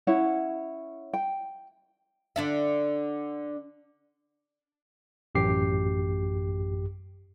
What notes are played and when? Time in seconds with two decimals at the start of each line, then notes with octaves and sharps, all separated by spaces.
0.07 C#4 E4 C#5 F#5
1.13 G5
2.36 D3 D4 E5
5.35 A1 F#2 G4 C7